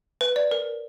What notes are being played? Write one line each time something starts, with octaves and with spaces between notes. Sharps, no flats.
B4
D5
A#4